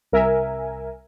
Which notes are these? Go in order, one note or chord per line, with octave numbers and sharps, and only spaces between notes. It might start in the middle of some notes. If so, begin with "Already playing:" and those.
C2 A#4 E5 G#5